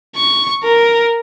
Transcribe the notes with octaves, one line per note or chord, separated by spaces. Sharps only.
C#6
A#4